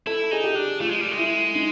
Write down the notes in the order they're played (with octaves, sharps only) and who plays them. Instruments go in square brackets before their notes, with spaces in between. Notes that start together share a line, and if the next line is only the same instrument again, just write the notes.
[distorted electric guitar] E4 [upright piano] A4
[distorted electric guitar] D#4 [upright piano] G#4
[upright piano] G4
[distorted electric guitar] D4
[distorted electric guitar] A3 [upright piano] F4
[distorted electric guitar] G#3
G3
G#3
[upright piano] E4
D#4